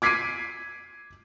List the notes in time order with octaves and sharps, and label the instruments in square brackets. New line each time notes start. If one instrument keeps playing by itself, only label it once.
[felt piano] D6 G#6 B6 C7 D7 D#7